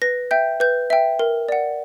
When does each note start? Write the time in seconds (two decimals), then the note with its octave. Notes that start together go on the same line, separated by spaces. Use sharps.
0.02 B4 A#6
0.31 E5 G5 G6
0.60 B4 G6
0.90 E5 G5
1.19 A#4
1.49 D5 F#5